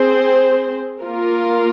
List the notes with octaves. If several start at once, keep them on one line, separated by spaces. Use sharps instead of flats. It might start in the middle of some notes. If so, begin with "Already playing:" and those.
Already playing: C4 G#4 C5
A#3 F4 A#4